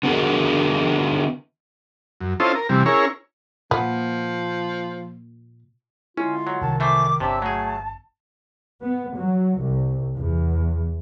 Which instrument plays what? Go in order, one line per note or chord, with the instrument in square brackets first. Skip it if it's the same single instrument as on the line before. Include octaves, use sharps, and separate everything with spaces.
[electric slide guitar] D3 B3 F#4 G#4 A#4 B4
[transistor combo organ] F#2
C#4 E4 F4 A4 C5 D#5
A#4
C3 E3 G3
C#4 E4 G#4 A#4 C#5
[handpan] A#2 [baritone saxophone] F3 [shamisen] B3
[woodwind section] D3 G#3 F4 [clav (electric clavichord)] C#4 [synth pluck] E4
[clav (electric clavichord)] F#3
[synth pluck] C2 [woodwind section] D#3 [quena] A5
[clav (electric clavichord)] E3 A3 C5 [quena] D6
[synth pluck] G1 [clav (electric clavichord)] C3 [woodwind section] C#5 D5 E5 [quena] A5
[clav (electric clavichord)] F#3 G#4 [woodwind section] A3
[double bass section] B3
F#3
C2
E2